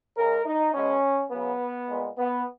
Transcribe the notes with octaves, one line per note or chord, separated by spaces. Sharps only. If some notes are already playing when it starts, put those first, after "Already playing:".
C#3 G#3 A#4
D#4
B2 G#3 C#4
C#3 F#3 B3
A#2 G#3
B3